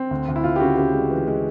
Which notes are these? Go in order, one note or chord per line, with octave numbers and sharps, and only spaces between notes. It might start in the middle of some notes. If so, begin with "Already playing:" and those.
Already playing: C4
D2
D2
E4
D2 F4
G4
C#3 F#4
C#3 G4
G#3
E3
G#3